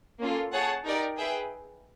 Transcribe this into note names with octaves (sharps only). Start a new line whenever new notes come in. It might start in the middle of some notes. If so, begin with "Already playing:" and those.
A#3 C#4 F4 A4
G#4 C#5 F#5 A5
D#4 G4 A#4 D5
G#4 B4 E5 G5